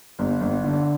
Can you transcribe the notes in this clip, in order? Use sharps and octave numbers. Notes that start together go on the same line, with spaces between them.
G1
G1
D3